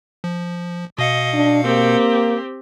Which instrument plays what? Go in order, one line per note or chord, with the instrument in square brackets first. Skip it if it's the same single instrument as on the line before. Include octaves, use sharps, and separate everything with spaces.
[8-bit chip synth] F3
[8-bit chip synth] B2 F5 C#7 [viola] D#5
[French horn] D4
[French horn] A#3 [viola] C4 G4